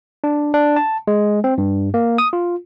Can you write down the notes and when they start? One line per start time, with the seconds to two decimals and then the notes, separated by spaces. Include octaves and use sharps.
0.24 D4
0.54 D4
0.76 A5
1.07 G#3
1.44 C4
1.58 G2
1.94 A#3
2.18 D#6
2.33 F4